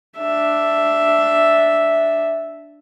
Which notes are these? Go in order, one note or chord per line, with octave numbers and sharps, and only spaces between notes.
D4 E5